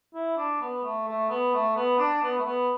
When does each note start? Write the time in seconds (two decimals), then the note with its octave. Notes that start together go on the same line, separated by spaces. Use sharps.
0.14 E4
0.37 D4
0.61 B3
0.84 A3
1.07 A3
1.29 B3
1.53 A3
1.76 B3
1.98 D4
2.22 B3
2.38 A3
2.44 B3